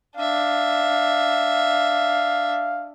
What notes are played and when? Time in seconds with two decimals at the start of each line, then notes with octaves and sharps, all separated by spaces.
0.17 D4 E5 F5